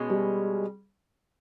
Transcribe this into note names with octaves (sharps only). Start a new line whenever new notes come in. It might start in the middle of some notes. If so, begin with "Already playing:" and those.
Already playing: B2 G#3 C#4
G3